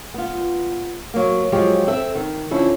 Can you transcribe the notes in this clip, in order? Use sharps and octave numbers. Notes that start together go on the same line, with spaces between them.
B3 F4
F#3 A#3
F3 F#3 G#3 F4 G4
C4 A4 E5
D#3
D3 F3 C#4 E4